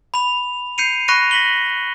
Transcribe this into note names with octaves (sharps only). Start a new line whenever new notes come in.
B5 F7
G6 C7 C#7 D#7 F7
B5 C#6 F#6 A#6 C#7 D#7
A#6 B6 F#7 G7